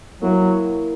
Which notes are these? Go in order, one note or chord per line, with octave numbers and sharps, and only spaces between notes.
F#3 A#3 E4 A#4